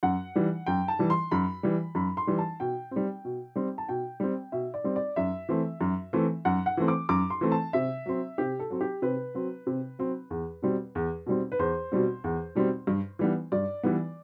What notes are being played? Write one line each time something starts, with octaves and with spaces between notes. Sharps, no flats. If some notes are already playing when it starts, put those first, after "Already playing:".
F#2 F#5
E3 G3
F#2 G5
A5
E3 G3
C6
F#2 B5
E3 G3
F#2 B5
C6
E3 G3
A5
B2 G5
G3 C4
B2
G3 C4
A5
B2 G5
G3 C4
B2 E5
D5
G3 C4
D5
F#2 E5
E3 A3 C4
F#2
E3 A3 C4
F#2 F#5
F#5
E3 A3 C4
D6
F#2 D6
C6
E3 A3 C4
A5
C3 E5
F#3 C4
C3 G4
A4
F#3 C4
G4
C3 B4
F#3 C4
C3
F#3 C4
E2
B2 G3 C4
E2
B2 G3 C4
B4
E2 C5
B2 G3 C4
E2
B2 G3 C4
G2
E3 G3 B3
G2 D5
E3 G3 B3